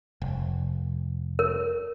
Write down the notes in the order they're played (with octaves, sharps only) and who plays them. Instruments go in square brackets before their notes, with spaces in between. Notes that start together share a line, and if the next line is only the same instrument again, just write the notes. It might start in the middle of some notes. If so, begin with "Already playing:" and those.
[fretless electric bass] F1
[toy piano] A#4